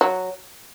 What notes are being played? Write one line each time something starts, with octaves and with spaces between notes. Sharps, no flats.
F#3